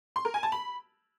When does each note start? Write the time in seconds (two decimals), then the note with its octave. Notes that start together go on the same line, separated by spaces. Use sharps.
0.16 C6
0.25 A#4
0.34 G#5
0.43 A5
0.52 B5